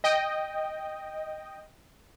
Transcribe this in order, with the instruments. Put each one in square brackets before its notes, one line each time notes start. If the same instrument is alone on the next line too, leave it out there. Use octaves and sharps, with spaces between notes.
[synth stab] D#5 G5